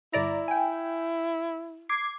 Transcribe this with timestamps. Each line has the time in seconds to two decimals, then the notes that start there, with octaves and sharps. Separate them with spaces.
0.14 G1 E4 D5 A#5
0.48 G5 G#5
1.89 D6 G#6 C7